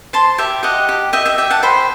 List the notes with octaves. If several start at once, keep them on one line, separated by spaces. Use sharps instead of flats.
C5 A5 C6
G4 E5 G5
G4 D#5 F#5
G4
D#5 E5 G5
E5 G5
G4 E5 G5
F#5 A5
C5 G5 B5